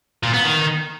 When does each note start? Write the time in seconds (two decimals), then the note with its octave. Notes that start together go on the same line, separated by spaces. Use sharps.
0.23 A#2
0.33 B3
0.44 D#3